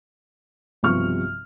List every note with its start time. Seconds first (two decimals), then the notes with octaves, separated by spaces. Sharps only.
0.83 B1 G2 C3 F3 C#6 F6